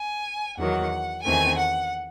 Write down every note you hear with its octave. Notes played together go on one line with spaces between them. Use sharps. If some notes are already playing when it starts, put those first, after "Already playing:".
Already playing: G#5
E2 D#3 F#3 F#5
E2 D#3 A3 C4 G#5
F#5